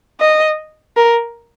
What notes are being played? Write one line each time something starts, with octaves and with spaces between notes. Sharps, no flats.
D#5
A#4